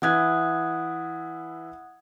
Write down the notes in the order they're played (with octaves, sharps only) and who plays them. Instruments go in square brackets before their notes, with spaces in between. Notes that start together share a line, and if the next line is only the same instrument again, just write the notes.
[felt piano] E3 E4 G#6 [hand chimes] F#5 D#6 F#6